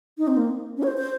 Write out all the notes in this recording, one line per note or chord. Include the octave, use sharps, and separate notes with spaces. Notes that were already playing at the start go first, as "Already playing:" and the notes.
D#4
C4
A#3
C#4
C#5
C5
C5